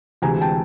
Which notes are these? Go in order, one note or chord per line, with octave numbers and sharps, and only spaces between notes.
D2 C3 E3 G#3 G#5 A#5
G5 A5